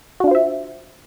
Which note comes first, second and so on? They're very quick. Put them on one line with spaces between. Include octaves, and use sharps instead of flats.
F#4 D4 F4 C5 E5